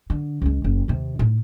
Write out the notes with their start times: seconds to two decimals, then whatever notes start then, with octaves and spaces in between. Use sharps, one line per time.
0.10 D3
0.42 C#2 G#3
0.64 F#1
0.88 D#2 C3
1.19 A2 D#4